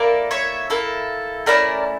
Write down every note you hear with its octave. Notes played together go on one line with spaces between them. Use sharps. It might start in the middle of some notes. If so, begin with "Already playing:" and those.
Already playing: A#3 E4 A4 A#4 D5
C#5 E5
A#3 E4 A4
A3 C#4 E4 A#4 D5